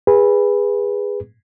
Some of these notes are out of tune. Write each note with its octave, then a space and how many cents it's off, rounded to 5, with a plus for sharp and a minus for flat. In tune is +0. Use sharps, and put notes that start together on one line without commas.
G#4 -25 B4 -10